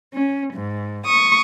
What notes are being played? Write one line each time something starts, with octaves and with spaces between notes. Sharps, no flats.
C#4
G#2
C#6 D#6